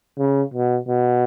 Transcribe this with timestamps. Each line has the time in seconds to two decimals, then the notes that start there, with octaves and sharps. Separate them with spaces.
0.19 C#3
0.54 B2
0.88 B2